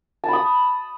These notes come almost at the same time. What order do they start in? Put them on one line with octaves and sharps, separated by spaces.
A5 B5 D#6